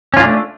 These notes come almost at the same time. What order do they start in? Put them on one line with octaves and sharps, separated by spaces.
C#4 F4 D4 A3